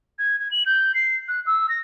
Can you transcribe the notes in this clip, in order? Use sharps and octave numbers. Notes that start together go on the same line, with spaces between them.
G#6
G#6
F#7
G6
C7
F#6
E6
A#6